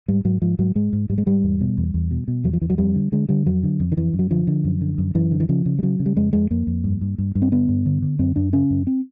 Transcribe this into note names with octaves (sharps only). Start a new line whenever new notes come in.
G#2 G3
G#2 F#3
G#2 F3
G#2 F#3
G#2 G#3
G#2
G#2 G3
G#3
G#2 G3
E2
B2
E2
E2
B2
B2
E2 F#3
F3
E2 E3
F#3
F2 G3
D3
D3 G#3
D3 G3
F2 F#3
D3
F2
D#3
F2 E3
F#2
F#3
D3 F3
D3
F#2
D3
F#2
F#2 E3
D3
E3
C#3 F3
C#3
G3
C#3 F#3
C#3
G3
F2 G#3
F2 G#3
F2 A#3
F2
G2
G2
G2
G2
C4
D3 B3
G2
D3
D3
F#2 C4
F#2 D4
C#3 C#4
F#2
C4